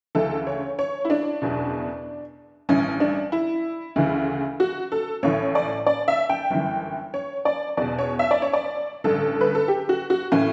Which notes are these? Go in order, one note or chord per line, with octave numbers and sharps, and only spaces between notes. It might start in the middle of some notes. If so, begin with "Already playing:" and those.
D2 C#3 E3 A4
C#5
C#5
E4
D4
F#1 E2 B2
A1 G2 E3 C#4
D4
E4
D2 C#3 E3
F#4
A4
A1 A2 E3 C#5
D5
D5
E5
G5
G1 F#2 E3
C#5
D5
E2 B2 D5
C#5
E5
D5
C#5
D5
A1 G2 D3 A4
B4
A4
G4
F#4
F#4
A2 E3 C#4